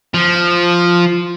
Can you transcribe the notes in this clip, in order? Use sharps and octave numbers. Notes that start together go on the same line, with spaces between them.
F3